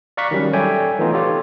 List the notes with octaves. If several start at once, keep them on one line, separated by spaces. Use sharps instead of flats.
D5 F5 A#5 C#6 F#6 B6
D#3 F#3 G3 C#4
A4 C#5 D5 E5 G5 G#5
E3 A3 B3 D#4 F4
F4 G4 A4 C#5